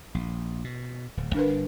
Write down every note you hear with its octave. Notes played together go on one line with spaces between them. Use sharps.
A#1
B2
D1
G1 D4 A#4 B4